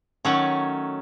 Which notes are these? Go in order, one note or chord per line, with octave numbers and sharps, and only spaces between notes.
D#3 F#3 A3 C#4